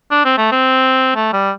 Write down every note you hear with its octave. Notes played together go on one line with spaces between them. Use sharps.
D4
C4
A3
C4
A3
G3